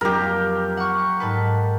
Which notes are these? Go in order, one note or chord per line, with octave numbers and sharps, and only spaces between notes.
F2 F#3 A#3 G4 A#4
F#5 C#6
G#2 A4 B4